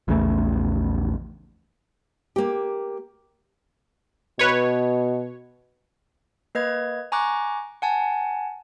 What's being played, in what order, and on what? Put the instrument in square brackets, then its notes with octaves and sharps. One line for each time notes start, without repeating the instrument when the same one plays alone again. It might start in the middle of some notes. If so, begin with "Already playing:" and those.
[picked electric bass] A#1 E2 C#3 A3
[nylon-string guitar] A#3 G4
[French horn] B2 [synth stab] B4 C#5
[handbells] A#3 B4 D#5 G#6
G#5 A#5 C#6 D6 F#6
F#5 G#5 A5